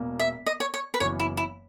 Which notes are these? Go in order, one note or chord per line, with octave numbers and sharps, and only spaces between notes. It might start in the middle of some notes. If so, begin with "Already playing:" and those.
Already playing: E1 E2 B2 A#3
E5
D#5
C#5
C#5
B4
F#1 F#2 E3 B3 C#5
E4
E4